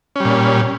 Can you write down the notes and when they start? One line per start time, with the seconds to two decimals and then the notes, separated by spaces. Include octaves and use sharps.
0.16 C#4
0.20 G3
0.25 A#2